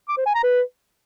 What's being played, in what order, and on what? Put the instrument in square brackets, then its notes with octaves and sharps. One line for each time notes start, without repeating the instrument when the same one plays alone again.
[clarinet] D6
C5
G#5
A#5
B4